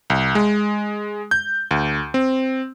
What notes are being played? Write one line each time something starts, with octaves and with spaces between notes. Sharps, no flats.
C2
G#3
G6
D2
C4